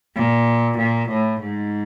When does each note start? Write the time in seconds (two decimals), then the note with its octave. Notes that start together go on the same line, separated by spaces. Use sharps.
0.15 A#2
0.78 A#2
1.09 A2
1.41 G#2